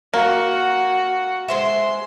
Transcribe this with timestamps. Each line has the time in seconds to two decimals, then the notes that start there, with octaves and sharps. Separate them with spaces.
0.14 A#3 F#4 F#5
1.48 G#3 C5 E5 C6